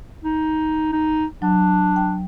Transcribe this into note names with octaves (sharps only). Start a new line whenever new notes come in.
D#4
D#4
F#3 D4
G5